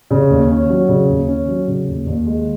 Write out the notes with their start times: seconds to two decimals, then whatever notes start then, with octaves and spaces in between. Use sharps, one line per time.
0.11 C#3
0.30 D#2
0.49 C#4
0.70 F#3
0.89 C#3
1.09 D#2
1.28 C#4
1.48 F#3
1.68 C#3
1.87 D#2
2.06 D#2
2.27 G#3